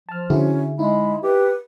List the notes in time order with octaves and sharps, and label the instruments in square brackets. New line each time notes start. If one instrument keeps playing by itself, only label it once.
[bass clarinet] F3 [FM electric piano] A5 F6
[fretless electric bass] D3 D4 [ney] C#4 [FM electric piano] E4 F#4 G#4
[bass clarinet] G#3 [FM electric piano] D#4 E4 [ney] B5
[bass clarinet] G4 [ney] B4